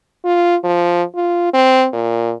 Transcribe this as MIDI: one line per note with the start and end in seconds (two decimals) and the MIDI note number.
0.25 0.56 65
0.64 1.03 53
1.15 1.49 65
1.53 1.87 60
1.93 2.34 46